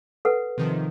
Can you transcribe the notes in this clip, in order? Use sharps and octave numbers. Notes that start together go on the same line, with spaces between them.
A4 B4 F#5
C3 D#3 F3